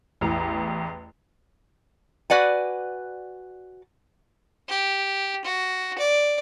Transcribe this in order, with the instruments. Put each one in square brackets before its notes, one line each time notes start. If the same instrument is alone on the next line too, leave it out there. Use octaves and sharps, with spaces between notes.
[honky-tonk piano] A1 E2 A#5
[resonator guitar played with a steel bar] F#4 B4 D5 F#5 G#5
[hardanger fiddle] G4
F#4
D5